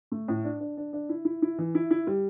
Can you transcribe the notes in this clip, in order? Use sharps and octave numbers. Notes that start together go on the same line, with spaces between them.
A3
A2
D4
D4
D4
D4
E4
E4
E4
E3
E4
E4
G3